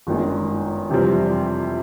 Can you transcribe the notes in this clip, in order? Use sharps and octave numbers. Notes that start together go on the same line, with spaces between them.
G1 F#2 D#3 G#3
F2 C3 E3 G3 C4